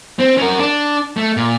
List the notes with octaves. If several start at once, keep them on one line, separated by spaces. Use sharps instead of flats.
C4
C#4 A#4
D4
A3
A#2